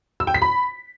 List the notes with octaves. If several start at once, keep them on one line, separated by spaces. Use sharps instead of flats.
E6
G5
B6
B5